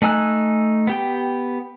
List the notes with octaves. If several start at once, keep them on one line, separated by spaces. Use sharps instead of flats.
A3 D#4 G#5 E6 F#6
B3 G4 G5